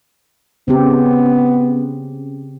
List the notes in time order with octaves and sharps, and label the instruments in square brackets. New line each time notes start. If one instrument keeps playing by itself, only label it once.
[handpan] C#3 C4 G4 [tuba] B3